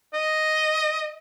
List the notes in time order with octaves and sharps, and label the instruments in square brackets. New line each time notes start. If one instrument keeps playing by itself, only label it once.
[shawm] D#5